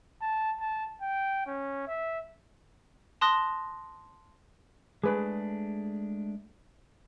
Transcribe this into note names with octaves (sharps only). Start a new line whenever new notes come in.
A5
A5
G5
C#4
E5
A5 C6 D#6 F#6 A#6
G#3 A3 D4 G#4 B4